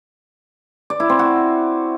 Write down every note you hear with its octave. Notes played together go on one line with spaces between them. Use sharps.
D5
E4
C4
F#4